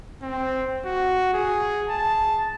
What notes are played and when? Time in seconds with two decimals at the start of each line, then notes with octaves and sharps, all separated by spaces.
0.22 C4
0.85 F#4
1.34 G#4
1.89 A5